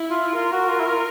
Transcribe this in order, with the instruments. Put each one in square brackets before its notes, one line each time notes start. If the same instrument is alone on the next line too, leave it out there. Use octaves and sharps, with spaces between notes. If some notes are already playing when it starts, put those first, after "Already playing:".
Already playing: [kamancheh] E4
[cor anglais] F4
[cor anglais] F4 [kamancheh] A#4
[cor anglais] F#4
F4
E4
F4